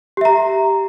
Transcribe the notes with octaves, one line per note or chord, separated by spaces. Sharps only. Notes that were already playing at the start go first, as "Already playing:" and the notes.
G4 E5 A#5